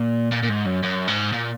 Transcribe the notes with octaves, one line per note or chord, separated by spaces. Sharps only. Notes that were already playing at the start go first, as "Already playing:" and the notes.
Already playing: A#2
A#2
A#2
G#2
F#2
F#2
G#2
A#2